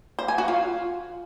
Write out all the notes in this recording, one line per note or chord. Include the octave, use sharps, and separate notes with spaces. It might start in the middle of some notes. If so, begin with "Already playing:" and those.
C5
G#5
F#4
F4